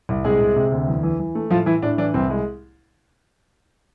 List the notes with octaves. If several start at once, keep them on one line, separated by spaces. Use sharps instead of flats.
C2
C3 G#3 G#4
C3
C3
D2
E2
E3
E3
A3
A2 F3 F4
E3 E4
A2 D4
E3 D4
C2 C4
G#3